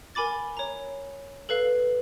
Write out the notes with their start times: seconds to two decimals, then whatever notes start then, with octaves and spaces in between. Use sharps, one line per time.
0.15 A#4 G#5 B5 D6 A6
0.57 C#5 A#5
1.49 A4 B4 F5